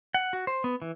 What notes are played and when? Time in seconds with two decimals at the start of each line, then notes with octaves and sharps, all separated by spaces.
0.14 F#5
0.33 F#4
0.47 C5
0.64 B3
0.82 E3